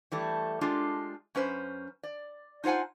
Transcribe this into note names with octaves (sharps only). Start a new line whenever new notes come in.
E3 G3 A3
G#3 D4 F4 G4 A4
F#2 C#4 B4 C5
D5
D#4 F4 C5 F#5 G#5